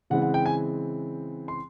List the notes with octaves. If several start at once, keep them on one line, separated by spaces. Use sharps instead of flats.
C#3 E3 G#3 C4 F#5
F#5
G5
G#5
C6